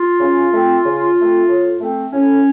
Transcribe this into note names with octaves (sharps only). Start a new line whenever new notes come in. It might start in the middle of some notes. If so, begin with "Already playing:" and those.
Already playing: F4
C#3
A3 C4
C#3
A3 C4
A2
A3 C4
A2 C#4